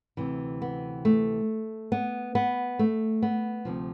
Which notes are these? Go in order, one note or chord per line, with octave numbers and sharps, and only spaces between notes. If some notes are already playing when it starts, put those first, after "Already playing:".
D2 C3 E3
B3
A3
B3
B3
A3
B3
D2 C3 F3